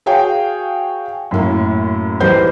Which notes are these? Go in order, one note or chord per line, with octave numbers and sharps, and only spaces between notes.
F#4 G#4 C#5 F5 G5
F#2 A2 A#3 E4
B1 E3 G3 A#4 C5 G6